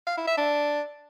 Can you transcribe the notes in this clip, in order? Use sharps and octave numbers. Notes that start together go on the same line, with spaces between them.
F5
E4
E5
D4